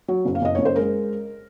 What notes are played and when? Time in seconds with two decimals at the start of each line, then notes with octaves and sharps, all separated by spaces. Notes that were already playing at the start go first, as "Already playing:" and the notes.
0.08 F#3
0.25 F#1
0.35 F5
0.42 F#1 D#5
0.55 F#1 C#5
0.65 C5
0.76 G#3 A#4